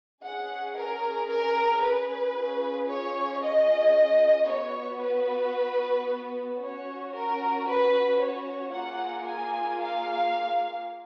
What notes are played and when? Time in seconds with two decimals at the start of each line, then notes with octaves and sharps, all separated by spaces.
0.24 C#4 G#4 F#5
0.77 A#4
1.30 A#4
1.83 B4
2.35 C#4 F4 G#4
2.89 C#5
3.41 D#5
4.48 B3 F#4 C#5
5.02 B4
6.60 C#4 F#4 C#5
7.13 A#4
7.66 B4
8.19 C#5
8.72 A#3 F4 G#4 F#5
9.25 G#5
9.78 F5